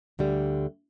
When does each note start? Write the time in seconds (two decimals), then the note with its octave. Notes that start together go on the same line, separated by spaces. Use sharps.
0.19 D2 D3 G3